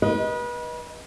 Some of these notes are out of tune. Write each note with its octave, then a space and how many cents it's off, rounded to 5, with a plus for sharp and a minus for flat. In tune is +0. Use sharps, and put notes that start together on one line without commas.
B4 -30 D#5 +5